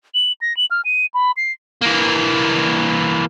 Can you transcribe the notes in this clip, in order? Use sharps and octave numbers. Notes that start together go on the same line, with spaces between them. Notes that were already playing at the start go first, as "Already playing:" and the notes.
F#7
A#6
F#7
F6
D#7
B5
C7
E3 A#3